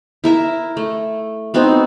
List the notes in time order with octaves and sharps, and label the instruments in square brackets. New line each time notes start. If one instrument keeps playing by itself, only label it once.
[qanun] E4 A#4 E5
A3
B3 C4 D#4 F#4